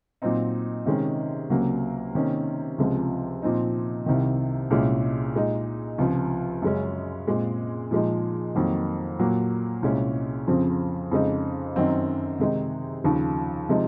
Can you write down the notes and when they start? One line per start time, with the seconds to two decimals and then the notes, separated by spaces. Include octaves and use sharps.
0.22 A#2 F#3 C4 D#4
0.86 C3 D#3 G#3 C#4
1.50 C#2 C3 F#3 A#3
2.15 C3 D#3 A#3 C#4
2.78 C#2 C3 F3 G#3
3.42 A#2 F3 C4 D#4
4.06 C2 C3 D#3
4.70 C2 A#2 G#3 C#4
5.35 A#2 G#3 D#4
5.98 C#2 C3 F3
6.62 F#2 C#3 G#3 C#4
7.27 A#2 G#3 C4
7.91 A#2 F3 G#3 D#4
8.55 F2 D#3 F#3 A#3
9.19 A#2 F#3 A#3
9.82 C2 A#2 G#3 C#4
10.48 F2 C#3 F3 C4
11.12 F2 C#3 G#3 D#4
11.75 F#2 D#3 F#3 C4 D#4
12.39 C3 D#3 G#3 D#4
13.04 D#2 C#3 F3
13.69 C3 F3 G#3 D#4